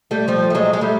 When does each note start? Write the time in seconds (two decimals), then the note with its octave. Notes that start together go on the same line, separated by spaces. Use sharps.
0.11 G3 A3
0.28 F3 G3
0.50 A3
0.55 F#3 G#3
0.73 G#3
0.81 G3 A3